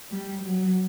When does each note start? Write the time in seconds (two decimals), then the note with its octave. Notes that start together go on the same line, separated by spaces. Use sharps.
0.11 G3
0.43 F#3